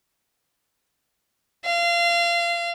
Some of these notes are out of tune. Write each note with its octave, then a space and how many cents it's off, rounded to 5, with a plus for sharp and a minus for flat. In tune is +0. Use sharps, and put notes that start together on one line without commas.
F5 -25